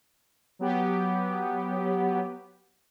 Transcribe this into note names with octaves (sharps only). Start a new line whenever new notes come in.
F#3 B3 G4